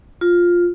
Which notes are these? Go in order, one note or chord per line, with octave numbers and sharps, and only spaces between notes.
F4